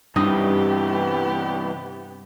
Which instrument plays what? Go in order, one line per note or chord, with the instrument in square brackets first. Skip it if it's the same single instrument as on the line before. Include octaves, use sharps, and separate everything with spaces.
[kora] G2 D#4 D#5 [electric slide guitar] C3 E3 G3 [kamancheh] B3 G4